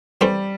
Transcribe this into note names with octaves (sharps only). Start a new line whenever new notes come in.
E3 G3 A3 C4